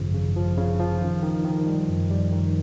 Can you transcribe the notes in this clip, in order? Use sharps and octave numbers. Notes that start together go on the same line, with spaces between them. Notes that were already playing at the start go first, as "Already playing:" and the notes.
Already playing: G#1 F#2 C#3 F3
C#3
F3
C#3
F3
D#3
D#3
D#3
G3
F#2
G3
D#3